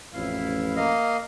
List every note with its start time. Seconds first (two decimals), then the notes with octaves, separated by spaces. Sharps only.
0.14 A1 F2 E4 F5
0.76 A#3 D#5 F5